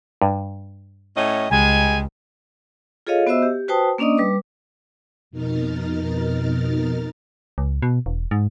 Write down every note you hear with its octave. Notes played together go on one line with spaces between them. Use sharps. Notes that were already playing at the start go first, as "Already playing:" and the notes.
G2
A2 C#4 D#5
C#2 G3 G#3 G#5
F4 G#4 A4 C#5 D#5 F5
B3 F#4 C5 D#5 E5 E6
G4
F#4 B4 C5 G5 A5 D#6
A#3 C#4 D4 D5 D#5 D#6
G3 B4 D6
F2 B2 D#4 A#4 F6 A6
C#2
B2
E1
G#2